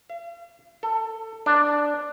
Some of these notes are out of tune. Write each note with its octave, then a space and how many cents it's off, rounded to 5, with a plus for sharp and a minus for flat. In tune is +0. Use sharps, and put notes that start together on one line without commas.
F5 -45
A4 +20
D4 +0